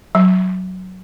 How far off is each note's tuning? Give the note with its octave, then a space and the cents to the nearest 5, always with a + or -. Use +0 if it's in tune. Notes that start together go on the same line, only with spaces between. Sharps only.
F#3 +5